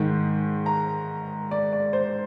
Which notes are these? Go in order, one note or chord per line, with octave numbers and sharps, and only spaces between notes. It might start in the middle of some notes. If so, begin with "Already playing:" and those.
Already playing: G#2 D#3
A#5
D5
D5
C5